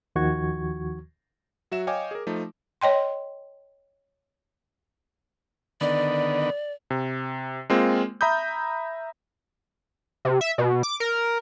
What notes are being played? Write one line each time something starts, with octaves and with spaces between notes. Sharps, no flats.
D#2 D#3 F3 F#4 C#6 G#6
F#3 F#4 E5 E7
C#5 D#5 F5 G5 G#5 D6
G#4 A#4
F3 A3 D#4
C#5 D#5 G5 C6
D3 D#3 B3 D5
C3
G#3 A#3 C4 F4
E5 A#5 B5 D#6 G6
C3
E5
B2
D6
A#4